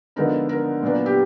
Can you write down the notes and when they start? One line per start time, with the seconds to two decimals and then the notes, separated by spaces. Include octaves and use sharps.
0.16 D3 F3 G#3 B3 D#4 A#4
0.49 A#4
0.83 A#2 F#3 B3 D4
1.06 G4